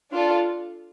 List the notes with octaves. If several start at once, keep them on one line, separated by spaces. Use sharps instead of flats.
D4 F4 A4